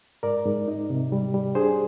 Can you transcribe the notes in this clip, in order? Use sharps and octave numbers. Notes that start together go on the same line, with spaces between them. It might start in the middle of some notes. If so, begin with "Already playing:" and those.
G#2 A#4 D5
G#2
D#4
C3
G3
G3
D4 G#4 C5